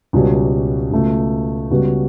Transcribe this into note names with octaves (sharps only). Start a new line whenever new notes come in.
C#2 B2 G3 C#4
C#2 B2 A3
C#2 C#3 G3 B3 F#4